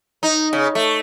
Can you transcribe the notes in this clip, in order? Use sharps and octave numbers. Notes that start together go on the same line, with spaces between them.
D#4
C#3
A3